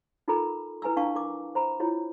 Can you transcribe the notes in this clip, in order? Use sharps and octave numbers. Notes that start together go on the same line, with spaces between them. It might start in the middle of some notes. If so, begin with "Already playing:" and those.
D#4 F4 A4 A#4 A#5 B5
E4 B4 G#5 A#5 E6
D4 F5 A5 C#6
A#4 D6
C5 A#5 B5
E4 F4 C#5